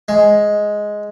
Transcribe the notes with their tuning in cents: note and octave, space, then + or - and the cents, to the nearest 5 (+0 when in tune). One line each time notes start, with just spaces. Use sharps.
G#3 +5